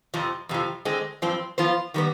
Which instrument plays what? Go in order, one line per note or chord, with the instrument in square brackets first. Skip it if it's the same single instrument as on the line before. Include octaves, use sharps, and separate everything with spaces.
[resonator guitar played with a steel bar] F2 C3 F3
F2 C3 F3
D3 G#3 C4
G2 F3 C4
F3 B3 F4 C5
D#3 G3 B3